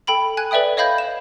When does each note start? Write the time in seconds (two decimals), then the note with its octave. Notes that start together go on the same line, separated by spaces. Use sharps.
0.07 A4 G5 B5 F#7
0.37 G#5 F#6 G#6
0.51 A4 B4 D5 E5 G5 D#6
0.77 C#5 D#5 F5 B5 G6 G#6
0.98 E7